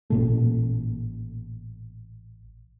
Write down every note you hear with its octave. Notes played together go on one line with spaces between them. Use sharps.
A1 A#2 A3